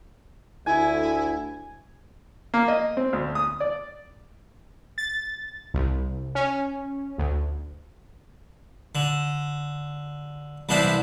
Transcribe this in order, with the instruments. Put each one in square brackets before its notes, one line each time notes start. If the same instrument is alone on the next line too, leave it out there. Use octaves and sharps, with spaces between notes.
[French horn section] D2 [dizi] E4 [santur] G#5
[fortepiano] A#3
D#5
C4
D2
D#6
D5
[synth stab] A6
C2
C#4
D2
[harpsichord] D3
C2 E3 B3 D4 C5